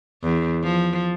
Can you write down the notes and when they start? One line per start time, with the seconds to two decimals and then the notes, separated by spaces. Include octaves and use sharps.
0.23 E2
0.64 F3